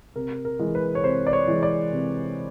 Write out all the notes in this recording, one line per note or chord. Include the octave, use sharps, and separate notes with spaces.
C3 A#4
A#4
E3 G#3
B4
C#5
C3 C5
D5
C#5
E3 G#3
D5
C3